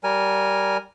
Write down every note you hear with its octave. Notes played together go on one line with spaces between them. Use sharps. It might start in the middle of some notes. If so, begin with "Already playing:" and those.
G3 A#4 G#5